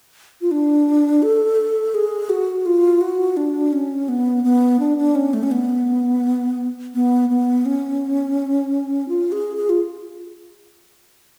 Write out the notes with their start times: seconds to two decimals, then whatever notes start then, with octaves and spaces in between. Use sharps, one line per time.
0.41 F4
0.51 D4
1.22 A4
1.94 G#4
2.29 F#4
2.66 F4
3.01 F#4
3.37 D4
3.73 C#4
4.08 B3
4.44 B3
4.80 D4
4.98 D4
5.15 C#4
5.34 A3
5.43 C#4
5.51 B3
6.95 B3
7.29 B3
7.66 C#4
9.08 F4
9.32 G#4
9.57 G#4
9.69 F4